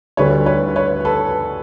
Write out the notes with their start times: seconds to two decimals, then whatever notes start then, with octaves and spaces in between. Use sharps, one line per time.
0.17 D2 D3 G3 B4 C#5
0.46 B4 C#5
0.76 B4 C#5
1.05 A4 B4